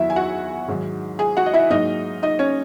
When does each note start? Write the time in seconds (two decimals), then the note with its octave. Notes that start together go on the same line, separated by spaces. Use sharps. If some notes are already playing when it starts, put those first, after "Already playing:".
Already playing: E2 D#3 F#3 E4 E5
0.10 G#5
0.16 F#4 F#5
0.68 G#2 D#3 F#3
1.19 G#4 G#5
1.37 F#4 F#5
1.46 D#5
1.53 E4 E5
1.70 G#2 F#3 A#3 D#4 D#5
2.22 D#4 D#5
2.39 C#4 C#5